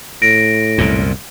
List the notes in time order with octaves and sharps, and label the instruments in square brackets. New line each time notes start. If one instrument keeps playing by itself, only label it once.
[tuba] A2 [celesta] A#6 D7
[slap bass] C2 F#2 A#2